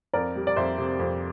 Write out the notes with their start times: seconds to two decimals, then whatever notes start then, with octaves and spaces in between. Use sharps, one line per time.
0.13 F2 A#4 D5
0.36 G3
0.47 D5
0.56 F2 C5 E5
0.78 C3
0.99 F2